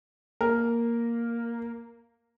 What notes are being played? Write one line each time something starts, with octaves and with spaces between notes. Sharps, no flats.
A#3 A#4